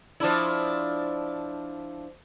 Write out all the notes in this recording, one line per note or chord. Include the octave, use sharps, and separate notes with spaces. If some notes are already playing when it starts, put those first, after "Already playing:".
F3 D4 E4